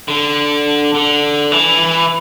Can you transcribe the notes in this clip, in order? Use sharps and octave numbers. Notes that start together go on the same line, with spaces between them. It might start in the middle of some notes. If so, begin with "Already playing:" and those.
D3
D3
E3